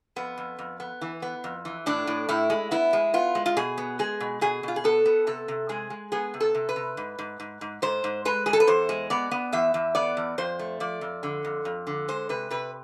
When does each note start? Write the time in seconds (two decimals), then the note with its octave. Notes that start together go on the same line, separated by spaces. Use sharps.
0.16 F2 B3
0.38 F2
0.59 F2
0.80 B3
1.01 E3
1.22 B3
1.44 F2
1.65 E3
1.86 A2 D4
2.07 A2
2.29 A2 E4
2.50 G#3
2.71 B3 E4
2.93 G#3
3.14 B3 F4
3.35 G#3
3.46 F4
3.57 B2 G#4
3.78 B3
3.99 G#3 G#4
4.20 B2
4.41 B2 G#4
4.63 B2 F4
4.76 G#4
4.84 B3 A4
5.06 B3
5.27 C3 A4
5.48 C3
5.69 G#3 G#4
5.90 G#3
6.12 B3 G#4
6.34 C3
6.40 A4
6.55 C3
6.69 B4
6.76 C3
6.97 G#2
7.19 G#2
7.40 G#2
7.61 G#2
7.82 G#2 C5
8.04 G#2
8.25 G#3 B4
8.46 G#2 G#4
8.53 A4
8.60 B4
8.67 E2 C5
8.89 G#3
9.10 B3 D5
9.31 B3
9.53 E2 E5
9.74 E2
9.95 B3 D5
10.17 E2
10.38 F2 C5
10.59 A3
10.80 F3 D5
11.01 F2
11.23 D3
11.45 F2
11.65 F2
11.87 D3
12.08 G#3 C5
12.29 C3 B4
12.51 C3 B4